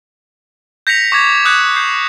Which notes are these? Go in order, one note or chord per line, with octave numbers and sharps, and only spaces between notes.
G6 A#6 B6 C#7 F7
C#6 D6 G#6
D#6 F#6 G6 C#7
G6 C7